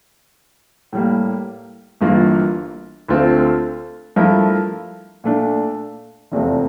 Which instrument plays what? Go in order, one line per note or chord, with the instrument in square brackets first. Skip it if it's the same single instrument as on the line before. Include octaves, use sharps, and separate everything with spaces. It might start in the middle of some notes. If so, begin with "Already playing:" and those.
[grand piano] A2 G3 A#3
G1 G2 E3 A#3 F4
D2 D3 A3 C4 F4
G2 F3 A3 E4 A#4
A#2 A3 D4
F1 E2 C3 F3 A3